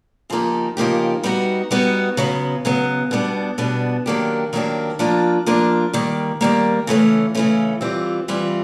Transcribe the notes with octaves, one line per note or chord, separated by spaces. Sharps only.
C#3 F3 A#3 D#4 G4
C#3 F3 A#3 D#4 G4
G3 B3 D#4 F#4
G3 B3 D#4 F#4
C#3 F#3 B3
C#3 F#3 B3
B2 G3 B3 D4
B2 G3 B3 D4
D#3 F#3 A#3 D4 G4
D#3 F#3 A#3 D4 G4
F3 A#3 D4 F4
F3 A#3 D4 F4
D#3 G3 A#3
D#3 G3 A#3
C#3 E3 A3 C#4
C#3 E3 A3 C#4
E3 G3 C4 F4
E3 G3 C4 F4